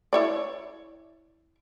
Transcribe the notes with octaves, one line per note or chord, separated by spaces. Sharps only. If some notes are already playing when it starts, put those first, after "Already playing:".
E4 C#5 D5